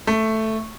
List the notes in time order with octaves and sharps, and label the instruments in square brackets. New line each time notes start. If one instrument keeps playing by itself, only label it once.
[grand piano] A3